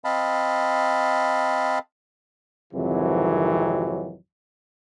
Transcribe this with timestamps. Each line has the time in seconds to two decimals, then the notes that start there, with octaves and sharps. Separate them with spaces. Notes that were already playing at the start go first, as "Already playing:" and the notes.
0.04 C4 D#5 F5 A5 B5
2.73 G#1 F2 C3 D#3 E3 F#3